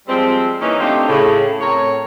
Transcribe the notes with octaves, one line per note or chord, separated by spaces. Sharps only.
F3 G3 G#3 C4
E3 A#3 C#4 D#4
A3 C4 D4 D#4 F4 G4
A2 C#3
A2 C4 A#4 C#5